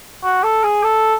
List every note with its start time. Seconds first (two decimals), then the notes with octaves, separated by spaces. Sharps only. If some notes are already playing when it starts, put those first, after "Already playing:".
0.23 F#4
0.43 A4
0.64 G#4
0.84 A4